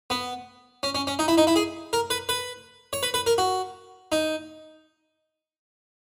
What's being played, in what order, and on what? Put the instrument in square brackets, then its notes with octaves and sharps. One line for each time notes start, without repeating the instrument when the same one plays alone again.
[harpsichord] B3
C#4
C#4
C#4
D#4
E4
D#4
E4
G#4
A#4
B4
B4
C#5
B4
B4
A#4
F#4
D#4